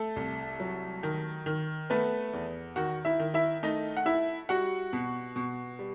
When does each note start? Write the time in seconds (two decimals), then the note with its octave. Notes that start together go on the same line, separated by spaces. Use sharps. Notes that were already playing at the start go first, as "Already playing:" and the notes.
Already playing: A3 A4
0.16 C2
0.60 F#3
1.03 D#3
1.46 D#3
1.90 A3 B3 B4
2.33 E2
2.76 D#3 F#4 F#5
3.05 E4 E5
3.19 D#3
3.34 E4 E5
3.63 A3 D#4 D#5
3.97 F#5
4.06 E4 E5
4.49 G3 F#4 F#5
4.93 B2
5.36 B2
5.79 G3